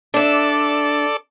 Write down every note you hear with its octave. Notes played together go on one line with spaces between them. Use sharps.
D4 A4 D5 E5